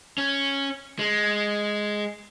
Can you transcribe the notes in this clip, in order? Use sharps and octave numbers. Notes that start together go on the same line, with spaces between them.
C#4
G#3